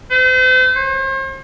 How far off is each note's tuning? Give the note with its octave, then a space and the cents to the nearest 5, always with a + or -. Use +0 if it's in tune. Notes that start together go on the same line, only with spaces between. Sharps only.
C5 -40
C5 +45